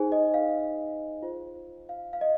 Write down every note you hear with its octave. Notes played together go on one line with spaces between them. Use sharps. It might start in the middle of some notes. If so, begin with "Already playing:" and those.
Already playing: D#4 G#4 C5 G#5
D#5
F5
F4 C5
F5
F5
D#5